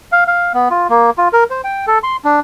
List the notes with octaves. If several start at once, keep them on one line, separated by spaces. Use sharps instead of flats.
F5
F5
B3
F4
A#3
F4
A#4
C5
G5
A4
C6
D4